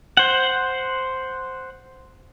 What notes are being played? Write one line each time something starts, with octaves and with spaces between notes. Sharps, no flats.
C5 F#5